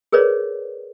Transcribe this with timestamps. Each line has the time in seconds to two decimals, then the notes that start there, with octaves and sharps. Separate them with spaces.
0.12 G#4 A#4 B4 C#5 D5